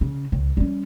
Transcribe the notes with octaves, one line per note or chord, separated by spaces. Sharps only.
C#3
C#2
G3 C#4